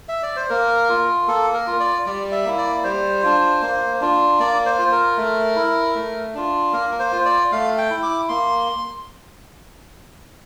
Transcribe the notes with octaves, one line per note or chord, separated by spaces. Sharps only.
E5
D5
C5
A#3 A#4
F4
A#3 A4
A#4
F4
D5
G3 D5
E5
A#3 E4
D5
G3 C5
D4 F4
A#3
D4 F4
A#3 D5
C5
F4
A#4
A3
E4
A3
D4 F4
A#3 A#4
C5
F4
D5
A3 F5
G5
E4
D6
A#3 C6